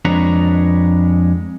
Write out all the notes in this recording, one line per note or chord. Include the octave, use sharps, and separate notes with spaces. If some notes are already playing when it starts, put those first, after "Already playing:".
F2 G#3 D4 B4 C#5 A#5